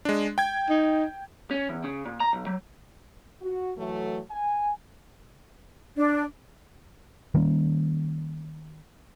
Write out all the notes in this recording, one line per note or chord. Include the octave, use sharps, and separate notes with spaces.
G#3 D4
G5 G#6
D#4
C#4
E2
C#3
A#2
A#5
B1
F#3
F#4
E3 F#3 A3
G#5
D4
D#3 G3 A#3 C#4